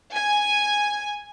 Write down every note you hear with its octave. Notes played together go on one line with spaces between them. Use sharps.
G#5